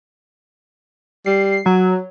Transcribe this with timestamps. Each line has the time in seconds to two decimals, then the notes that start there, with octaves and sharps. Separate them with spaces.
1.26 G3 C7
1.66 F#3 F#4